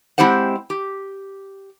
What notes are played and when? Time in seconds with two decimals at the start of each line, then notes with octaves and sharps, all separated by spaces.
0.18 G#3 C4 E4 G4 C5 F#5
0.70 G4